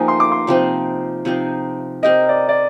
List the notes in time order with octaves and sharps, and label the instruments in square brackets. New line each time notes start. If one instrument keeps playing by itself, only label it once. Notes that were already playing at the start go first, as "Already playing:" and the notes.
Already playing: [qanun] F3 A#3 D#4 G4 [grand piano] G#5 A#5
[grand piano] C6
D6
C6
[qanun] C3 F3 C4 D#4
C3 F3 C4 D#4
[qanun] C4 G4 A#4 [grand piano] D#5
[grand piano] D5
D5